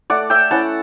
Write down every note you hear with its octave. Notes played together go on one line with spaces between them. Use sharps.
A3 D5 F#5
E5 G5
C#4 E4 F#5 A5